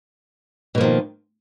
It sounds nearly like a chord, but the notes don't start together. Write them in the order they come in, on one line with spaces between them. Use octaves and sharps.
B2 A#3 F3 D#3